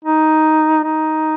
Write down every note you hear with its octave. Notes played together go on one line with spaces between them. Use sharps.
D#4
D#4